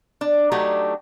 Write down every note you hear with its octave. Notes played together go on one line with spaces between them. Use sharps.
D4
F#3 A3 D4 D#4 F#4 G4